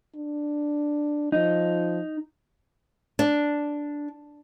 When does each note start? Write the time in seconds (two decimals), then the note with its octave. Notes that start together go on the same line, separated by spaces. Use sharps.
0.16 D4
1.32 F3 D#4
3.19 D4